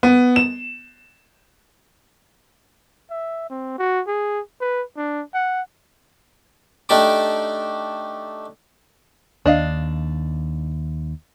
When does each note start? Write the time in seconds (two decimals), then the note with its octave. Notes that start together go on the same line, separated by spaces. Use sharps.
0.03 B3
0.36 E7
3.11 E5
3.50 C4
3.79 F#4
4.08 G#4
4.61 B4
4.97 D4
5.34 F#5
6.89 A3 D4 D#4 G4 A5 D6
9.46 D#2 D4 D#5 F5